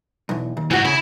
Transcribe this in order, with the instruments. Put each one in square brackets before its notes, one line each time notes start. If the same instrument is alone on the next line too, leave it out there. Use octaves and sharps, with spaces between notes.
[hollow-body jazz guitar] B1 E2
D#2
[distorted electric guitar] D2 G#2 [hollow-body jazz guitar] E3 F#4
[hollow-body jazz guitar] C#3 [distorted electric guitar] E4